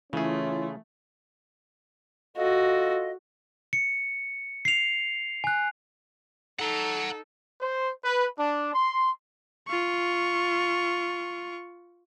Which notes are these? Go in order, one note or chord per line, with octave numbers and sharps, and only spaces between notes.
C#3 E3 A3 C#4 E4 F4 G#4
F4 F#4 A4 D#5
C#7
C7 F7
G#5 F#6
D#4 A4 F#5 A#5
C5
B4
D4
C6
F4 C#6